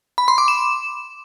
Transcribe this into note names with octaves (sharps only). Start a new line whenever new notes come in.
B5
C6
D6
E7